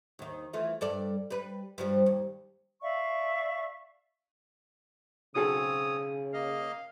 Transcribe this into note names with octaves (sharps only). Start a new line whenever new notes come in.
D#2 D#3
E3 A3 F4
G2 A4 D5
G3 B4
G2 F3 G3
D#2
D5 E5 F5 C#6
B1 C#3 C4 G#4 A4 C#5 D#6
A#3 D#5 F5